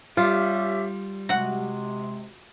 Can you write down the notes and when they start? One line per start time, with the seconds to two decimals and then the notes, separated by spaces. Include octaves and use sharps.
0.17 G3 C#4 F4 G4 E5
1.29 C3 G#3 F#4 F#5